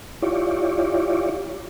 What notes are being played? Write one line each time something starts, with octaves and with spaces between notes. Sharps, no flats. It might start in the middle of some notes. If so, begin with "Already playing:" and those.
E4 F4 G4 C#5 D5